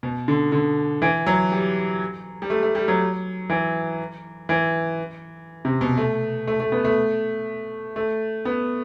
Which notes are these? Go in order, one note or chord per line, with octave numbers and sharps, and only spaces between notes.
B2
D3
D3
E3
F#3
G3
G3
A3
A3
G3
F#3
E3
E3
C3
B2
A3
A3
A3
B3
A3
A3
B3